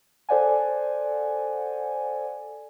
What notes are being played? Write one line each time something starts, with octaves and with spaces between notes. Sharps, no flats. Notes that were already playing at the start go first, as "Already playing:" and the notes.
A4 C5 D5 F#5 G#5